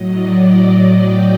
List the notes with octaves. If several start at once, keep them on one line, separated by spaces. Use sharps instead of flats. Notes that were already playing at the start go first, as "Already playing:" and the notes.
Already playing: A2 F#3 D#5
D5
G5